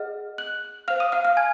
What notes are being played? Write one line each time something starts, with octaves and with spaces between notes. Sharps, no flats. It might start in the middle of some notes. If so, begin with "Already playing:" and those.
Already playing: G#4 D#5 F#5 F6
F#6 F#7
C5 F5 F6 F7
D#6 D#7
F5 F6
F5 F6
G#5 G#6